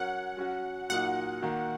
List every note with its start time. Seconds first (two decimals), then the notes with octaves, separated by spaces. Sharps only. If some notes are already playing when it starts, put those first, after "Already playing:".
Already playing: F#3 C#4 A#4 C#5 F#5
0.37 F#3 C#4 F#4
0.89 A#2 F#3 A#3 D#4 F#5
1.42 D#3 A#3 F#4 A#4